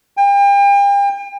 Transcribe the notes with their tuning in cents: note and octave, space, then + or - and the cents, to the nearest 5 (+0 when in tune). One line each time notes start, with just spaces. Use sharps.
G5 +40